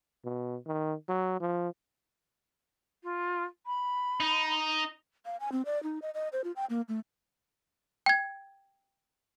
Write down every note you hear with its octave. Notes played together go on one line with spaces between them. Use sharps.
B2
D#3
F#3
F3
F4
B5
D#4
F5
G#5
C4
D5
D#4
D#5
D#5
C5
F4
G5
A#3
A3
G5 G#6